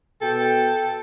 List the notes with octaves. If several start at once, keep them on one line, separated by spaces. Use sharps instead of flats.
B2 A4 G5